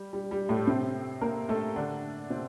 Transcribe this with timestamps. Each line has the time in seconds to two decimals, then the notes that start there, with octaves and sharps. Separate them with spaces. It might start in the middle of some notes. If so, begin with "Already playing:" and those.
Already playing: G3
0.13 G3
0.31 G3
0.49 A2 A3
0.67 C3 C4
1.21 A#3 A#4
1.49 A3 A4
1.76 D3 D4
2.30 C3 C4